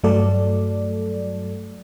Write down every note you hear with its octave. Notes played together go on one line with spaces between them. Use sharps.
G2 F#3 A3 A4 D5